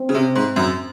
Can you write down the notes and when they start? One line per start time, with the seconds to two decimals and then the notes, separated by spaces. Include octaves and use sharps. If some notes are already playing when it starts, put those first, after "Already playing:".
Already playing: C4
0.09 C#3
0.14 C3
0.35 G#2
0.56 F#2